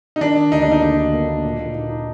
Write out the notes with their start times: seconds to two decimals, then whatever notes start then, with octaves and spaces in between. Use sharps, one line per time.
0.16 D#4
0.21 D#3 D4
0.37 D#3
0.52 D2 D#4
0.62 D4
0.68 A#3 D#4
0.82 D2 D#4
0.97 D2
1.13 A#3
1.29 A#3
1.45 A#2
1.60 A#2
1.75 D#4
1.90 D#4